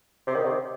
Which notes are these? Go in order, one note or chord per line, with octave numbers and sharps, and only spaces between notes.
C3
D#3
C3